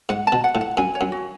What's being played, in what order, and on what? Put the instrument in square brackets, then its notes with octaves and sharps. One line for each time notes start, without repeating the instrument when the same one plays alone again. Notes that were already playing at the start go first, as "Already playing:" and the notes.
[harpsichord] G#2 [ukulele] F#5
[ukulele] A5
[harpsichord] B2
[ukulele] F#5
[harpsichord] A2
[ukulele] F#5
[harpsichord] F#2 [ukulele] G#5
[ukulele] C#5
[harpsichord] F#2
[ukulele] F#4